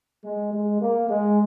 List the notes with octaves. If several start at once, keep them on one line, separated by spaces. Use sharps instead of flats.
G#3
G#3
A#3
G#3